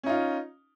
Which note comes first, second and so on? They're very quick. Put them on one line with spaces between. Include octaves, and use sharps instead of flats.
C#4 D#4 F4